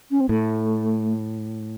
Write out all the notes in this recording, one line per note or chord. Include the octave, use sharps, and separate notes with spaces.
C#4
C4
A2 A3